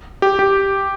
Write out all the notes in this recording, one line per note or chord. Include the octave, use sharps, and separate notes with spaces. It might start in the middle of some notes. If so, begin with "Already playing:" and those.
G4
G4